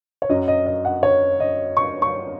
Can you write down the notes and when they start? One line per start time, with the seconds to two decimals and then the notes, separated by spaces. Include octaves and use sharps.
0.22 C#5
0.29 F#2 F#3 C#4 D#5
0.48 D#5
0.66 D#5
0.85 F#5
1.03 C#5
1.40 D#5
1.77 C#6
2.02 C#6